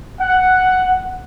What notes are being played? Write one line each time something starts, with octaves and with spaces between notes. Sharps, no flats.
F#5